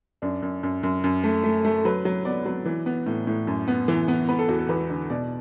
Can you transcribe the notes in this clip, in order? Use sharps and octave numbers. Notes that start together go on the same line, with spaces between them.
F#2 D4
F#2
F#2
F#2
F#2
A3
A3
A3
F#3 B4
F#3
B3 D5
F#3
E3
B3
A2
A2
F#2
B3
E3
B3
B3 B4
A4
E2 F#4
A4
E2 B4
D3
B2 D5